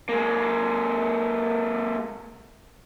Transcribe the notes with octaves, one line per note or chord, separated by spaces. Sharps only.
G#3 A#3